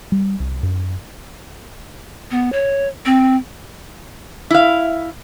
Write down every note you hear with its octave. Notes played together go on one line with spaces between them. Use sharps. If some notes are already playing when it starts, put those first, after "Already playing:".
G3
C2
F#2
B3
C#5
C4
E4 F5